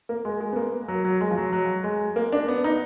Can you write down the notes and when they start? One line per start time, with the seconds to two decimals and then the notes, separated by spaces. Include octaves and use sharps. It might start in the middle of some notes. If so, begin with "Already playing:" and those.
0.09 A#3
0.25 G#3
0.41 G#3
0.53 B3
0.56 A#3
0.88 F#3
1.05 F#3
1.21 G#3
1.31 F3
1.37 F#3
1.52 F#3
1.84 G#3
2.16 A#3
2.32 D4
2.48 B3
2.64 D#4